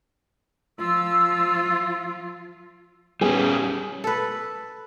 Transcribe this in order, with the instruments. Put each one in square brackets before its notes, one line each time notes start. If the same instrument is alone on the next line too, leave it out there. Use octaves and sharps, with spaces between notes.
[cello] F3 F4 [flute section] E6
[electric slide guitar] G3 C#4 [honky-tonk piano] B3 G#4
[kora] A4 B4